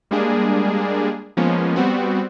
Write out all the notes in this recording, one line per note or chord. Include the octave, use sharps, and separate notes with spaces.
G3 G#3 A#3 D4 G#4
F3 G#3 A#3 B3 C#4
G3 B3 C4 F#4